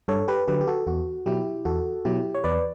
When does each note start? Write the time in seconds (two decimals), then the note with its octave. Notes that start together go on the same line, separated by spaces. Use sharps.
0.08 G2 A4 C#5
0.28 G4 B4
0.47 D3 F#3 G4 B4
0.61 G4
0.67 F#4 A4
0.87 E2 F#4
1.26 B2 F#3 E4 G4
1.65 E2 F#4 A4
2.05 B2 F#3 E4 G4
2.34 C#5
2.44 E2 B4 D5